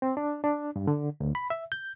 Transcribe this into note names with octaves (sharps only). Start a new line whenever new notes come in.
C4
D4
D4
G2
D3
D2
B5
E5
G6